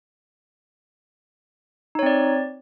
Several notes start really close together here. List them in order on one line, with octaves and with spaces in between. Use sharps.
D#4 C#5 C4 D5